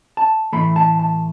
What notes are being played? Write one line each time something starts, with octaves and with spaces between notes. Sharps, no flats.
A5
A2 E3 A3 B5
A5
A5